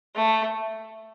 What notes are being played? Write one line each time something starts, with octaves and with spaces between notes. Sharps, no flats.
A3